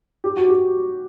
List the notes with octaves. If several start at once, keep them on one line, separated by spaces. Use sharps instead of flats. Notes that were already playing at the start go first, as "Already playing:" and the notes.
G4
F#4
G4